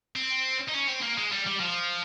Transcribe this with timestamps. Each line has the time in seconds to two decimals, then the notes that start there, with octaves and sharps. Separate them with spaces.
0.16 C4
0.68 D#4
0.74 C#4
0.88 C4
1.02 A#3
1.18 G#3
1.32 G3
1.46 G3
1.60 F3